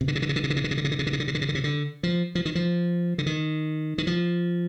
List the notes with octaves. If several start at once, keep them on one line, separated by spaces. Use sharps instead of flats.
C3
D3
C3
D3
C3
D3
C3
D3
C3
D3
C3
D3
C3
D3
C3
D3
C3
D3
C3
D3
C3
D3
C3
D3
F3
F3
D#3
F3
D3
D#3
D#3
F3